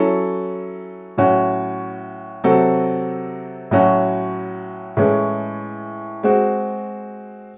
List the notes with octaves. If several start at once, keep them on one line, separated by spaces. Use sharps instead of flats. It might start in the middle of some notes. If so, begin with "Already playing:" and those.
Already playing: F#3 C#4 E4 A4
A2 F#3 C#4 F#4
C3 F#3 C4 F#4 A4
A2 F#3 C#4 F#4
A2 E3 G#3 C#4
G#3 C4 F#4